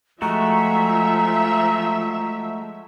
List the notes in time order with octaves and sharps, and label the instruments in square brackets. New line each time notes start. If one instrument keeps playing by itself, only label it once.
[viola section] F3 E5 [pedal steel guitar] G#3 A3 F#4 [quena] A#5